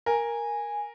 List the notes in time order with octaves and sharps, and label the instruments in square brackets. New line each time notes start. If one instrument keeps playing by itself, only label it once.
[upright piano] A#4 [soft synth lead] G#5